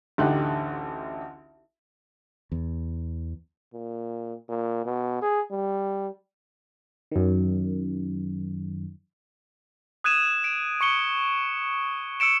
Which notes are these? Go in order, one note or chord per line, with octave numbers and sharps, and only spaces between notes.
A1 D2 D3 D#4 G4 F#6
E2
A#2
A#2
B2
G#4
G3
F#2 D#3
D#6 F#6 G#6 D#7 E7
D7
C#6 C#7 G7
E6 C#7 D7 E7